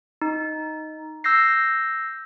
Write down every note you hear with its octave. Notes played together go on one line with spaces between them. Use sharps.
D#4
E6 G6 A#6 C7